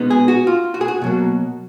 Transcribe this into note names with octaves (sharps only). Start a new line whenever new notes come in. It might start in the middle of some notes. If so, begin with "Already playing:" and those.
Already playing: B2 G#3 B3 D#4
G#4
F#4
F4
F#4
G#4
F#4
B2 F#3 A#3